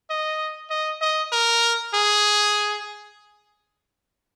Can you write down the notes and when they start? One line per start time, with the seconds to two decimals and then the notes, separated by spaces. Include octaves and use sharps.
0.10 D#5
0.70 D#5
1.01 D#5
1.32 A#4
1.94 G#4